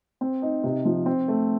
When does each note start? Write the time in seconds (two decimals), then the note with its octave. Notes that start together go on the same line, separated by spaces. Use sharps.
0.21 C4
0.42 D#4
0.64 C3
0.85 F3
1.06 C4
1.28 A3